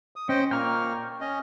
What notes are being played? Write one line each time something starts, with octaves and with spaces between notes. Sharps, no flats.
D#6
C#4 C5 D#5 G5
A#2 A#3 G5 A#5 C#6 F6
C#4 D#5